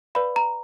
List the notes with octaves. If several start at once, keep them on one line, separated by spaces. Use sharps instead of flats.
B4 D5 F5 B5
A#5